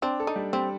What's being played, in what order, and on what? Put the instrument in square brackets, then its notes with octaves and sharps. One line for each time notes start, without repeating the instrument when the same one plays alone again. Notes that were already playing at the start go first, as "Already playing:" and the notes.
[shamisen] C4 [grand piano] D4
[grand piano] A4
[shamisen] D#4
[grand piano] G3
[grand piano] G3 [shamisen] C4